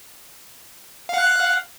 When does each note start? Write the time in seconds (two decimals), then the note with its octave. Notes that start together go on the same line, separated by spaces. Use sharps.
1.09 F5
1.14 F#5
1.18 F#6